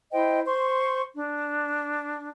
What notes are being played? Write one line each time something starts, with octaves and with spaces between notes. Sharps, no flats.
E4 C5 D#5 G5
C5 C6 C#6
D4